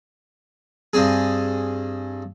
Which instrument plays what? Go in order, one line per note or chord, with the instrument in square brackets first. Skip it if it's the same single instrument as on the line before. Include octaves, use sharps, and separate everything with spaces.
[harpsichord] G2 C4 G#4